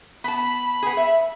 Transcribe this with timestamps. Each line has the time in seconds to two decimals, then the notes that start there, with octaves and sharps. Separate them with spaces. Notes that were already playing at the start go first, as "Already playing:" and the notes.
0.24 B3 A5 B5
0.82 B3 G#4
0.97 E5